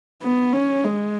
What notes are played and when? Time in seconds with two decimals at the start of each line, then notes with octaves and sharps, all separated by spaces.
0.23 B3
0.53 C#4
0.84 G#3